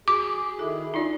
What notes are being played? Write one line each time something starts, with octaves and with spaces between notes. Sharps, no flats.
F#4 G#4 D6
D#3 E4 G#4 A4
D4 D#4 F4 D5